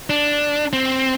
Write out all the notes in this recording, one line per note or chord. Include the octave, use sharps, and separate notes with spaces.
D4
C4